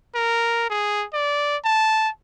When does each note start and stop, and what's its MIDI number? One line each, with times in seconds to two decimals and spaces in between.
0.15 0.69 70
0.70 1.05 68
1.13 1.57 74
1.64 2.09 81